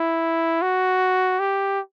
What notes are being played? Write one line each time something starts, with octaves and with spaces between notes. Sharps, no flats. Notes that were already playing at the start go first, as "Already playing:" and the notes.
Already playing: E4
F#4
G4